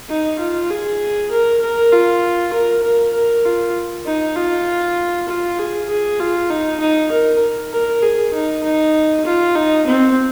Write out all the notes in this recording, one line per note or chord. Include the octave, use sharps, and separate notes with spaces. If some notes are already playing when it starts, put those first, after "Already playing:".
D#4
F4
G#4
A#4
A#4
F4
A#4
A#4
A#4
F4
D#4
F4
F4
G#4
G#4
F4
D#4
D#4
A#4
A#4
G#4
D#4
D#4
F4
D#4
C4